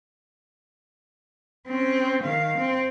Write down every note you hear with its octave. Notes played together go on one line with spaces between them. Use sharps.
C4 C#4
D#3 F5
C4